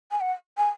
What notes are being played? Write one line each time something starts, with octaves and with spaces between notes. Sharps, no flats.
G#5
F#5
G#5